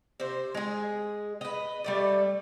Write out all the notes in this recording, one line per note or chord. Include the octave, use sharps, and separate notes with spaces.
C3 C5
G#3 G#4
B4 D#5
G3 A3 D5